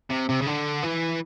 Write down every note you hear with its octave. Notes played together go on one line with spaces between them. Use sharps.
C3
C3
C#3
D3
E3